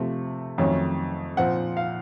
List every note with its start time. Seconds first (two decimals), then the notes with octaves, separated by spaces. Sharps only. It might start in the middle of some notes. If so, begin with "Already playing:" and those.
Already playing: C3 F3 A3 C4
0.58 F2 D#3 F#3 A3 C#4
1.37 A#2 F3 C4 F#5
1.77 F5